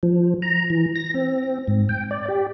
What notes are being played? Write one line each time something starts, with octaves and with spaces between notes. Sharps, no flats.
F3
A#5
E3
A#6
C4
G#2
G5
D5
G4